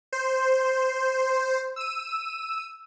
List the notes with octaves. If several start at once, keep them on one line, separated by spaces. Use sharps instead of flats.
C5
E6 D#7